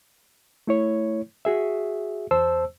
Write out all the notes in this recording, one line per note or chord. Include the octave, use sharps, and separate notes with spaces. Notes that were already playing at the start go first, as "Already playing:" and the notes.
A3 E4 C#5
F#4 G#4 E5
E2 C5 A5 E6